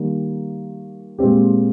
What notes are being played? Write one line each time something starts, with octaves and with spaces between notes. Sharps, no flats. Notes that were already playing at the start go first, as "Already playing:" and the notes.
Already playing: D#3 G3 A#3
A#2 G#3 C4 G4